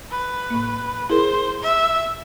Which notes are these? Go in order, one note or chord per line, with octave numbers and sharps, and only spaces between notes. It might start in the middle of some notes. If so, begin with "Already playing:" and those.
B4
A2 A#3
E4 G#4 A#4 C5
E5